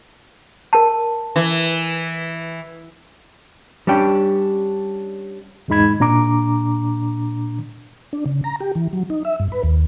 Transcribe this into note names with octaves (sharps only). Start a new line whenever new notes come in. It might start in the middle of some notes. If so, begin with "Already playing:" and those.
A#4 A5
E3
G3 C#4 D4 G4
E2 G#2 G#3 D#4 B5 G#6
A#2 D4 A#5 D6
D4
C#3
A#5
G4
E3
F#3
D#4
E5
G2
B4
D#2